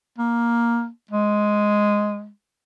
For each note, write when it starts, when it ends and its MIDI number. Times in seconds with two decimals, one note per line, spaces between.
0.18 0.88 58
1.11 2.29 56